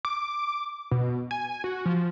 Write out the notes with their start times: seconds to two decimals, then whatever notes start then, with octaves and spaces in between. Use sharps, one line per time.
0.05 D6
0.91 B2
1.31 G#5
1.64 F#4
1.85 F3